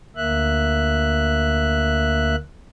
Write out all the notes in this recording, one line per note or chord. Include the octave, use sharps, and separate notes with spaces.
D2 A#3 E5 F#6